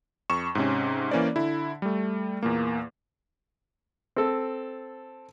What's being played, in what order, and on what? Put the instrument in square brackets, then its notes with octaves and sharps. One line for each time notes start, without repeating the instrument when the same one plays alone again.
[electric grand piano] F2 C#6 E7
G#2 C3 C#4
E3 A#3 C#4 C5 D5
D3 E4
G3 A3
E2 A#2 A#3
[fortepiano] C4 A4